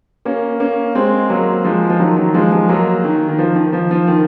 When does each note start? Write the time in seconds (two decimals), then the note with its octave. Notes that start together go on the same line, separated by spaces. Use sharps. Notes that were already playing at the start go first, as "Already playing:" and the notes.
0.25 A#3 C#4
0.60 A#3 C#4
0.95 G#3 C4
1.29 F#3 A#3
1.65 F3 G#3
1.90 F3
2.00 D#3 F#3
2.17 D#3 F#3
2.34 F3 G#3
2.52 F3 G#3
2.69 F#3 A#3
3.04 D#3
3.29 D#3
3.38 F3
3.55 D#3
3.73 F3
3.91 F3
4.08 D#3